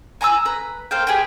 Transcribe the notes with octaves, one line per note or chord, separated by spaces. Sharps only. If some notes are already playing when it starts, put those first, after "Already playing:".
G#5 A#5 C6 E6
B4 A#5
A#3 C5 F5 G5
G4 G#4 B4 G5